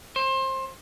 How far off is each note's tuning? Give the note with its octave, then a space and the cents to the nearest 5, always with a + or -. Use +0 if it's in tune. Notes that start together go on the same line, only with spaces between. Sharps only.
C5 +25